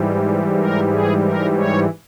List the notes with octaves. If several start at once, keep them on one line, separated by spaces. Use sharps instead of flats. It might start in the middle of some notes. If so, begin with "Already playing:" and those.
Already playing: G#2 E3 G3
A#4
G#4
A#4
C#5